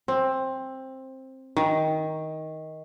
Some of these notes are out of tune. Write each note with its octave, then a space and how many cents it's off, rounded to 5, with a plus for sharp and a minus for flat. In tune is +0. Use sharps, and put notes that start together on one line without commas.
C4 +15
D#3 +15